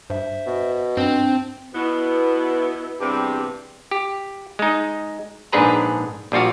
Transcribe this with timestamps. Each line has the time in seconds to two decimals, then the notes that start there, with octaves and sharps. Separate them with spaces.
0.10 G2 C5 E5
0.47 B2
0.97 G2 C4 D4
1.74 B2 B3 E4
3.00 E2 G2 C3 G3 C4 G4
3.91 G4
4.59 G#3 D#4
5.52 A#1 G#2 D4 G#4 B4 A#5
6.32 A#1 G3 F4 F#4 F5